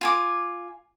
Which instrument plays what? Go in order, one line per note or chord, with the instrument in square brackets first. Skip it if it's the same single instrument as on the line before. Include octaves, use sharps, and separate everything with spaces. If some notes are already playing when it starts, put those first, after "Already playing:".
[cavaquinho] F4 G#5 D6